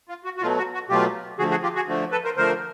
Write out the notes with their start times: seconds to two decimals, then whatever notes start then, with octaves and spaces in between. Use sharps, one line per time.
0.09 F4
0.24 F#4
0.37 F#4
0.41 B2 F#3 A3 F4
0.57 F#4
0.74 F#4
0.89 B2 F#3 A3 F4 G4
1.39 D3 F3 A3 F#4 G#4
1.51 F#4 G#4
1.63 F4 G4
1.75 F#4 G#4
1.87 D3 F3 A3
2.12 A4 B4
2.24 A#4 C5
2.36 D3 F3 A3 A#4 C5